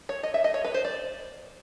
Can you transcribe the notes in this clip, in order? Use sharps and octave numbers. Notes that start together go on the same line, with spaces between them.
C#5
D#5
E5
D#5
C#5
B4
C5
D5